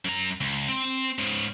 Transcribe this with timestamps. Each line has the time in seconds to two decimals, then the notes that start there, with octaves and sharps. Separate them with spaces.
0.05 F#2 A#5
0.41 C#2
0.69 C4
1.19 G#2 C#3